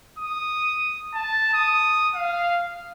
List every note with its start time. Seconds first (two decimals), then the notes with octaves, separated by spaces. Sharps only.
0.19 D#6
1.14 A5
1.54 D#6
2.14 F5